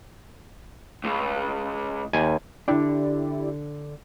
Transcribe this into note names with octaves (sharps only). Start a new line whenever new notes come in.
C#2
D#2 G#5
D3 D4 E4 G4 D5